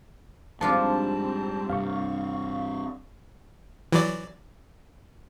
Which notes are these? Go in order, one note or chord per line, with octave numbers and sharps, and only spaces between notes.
G#2 F3 G3 C4 D4 F4 A5
G2 C3 F5 C#6
E3 F#3 D5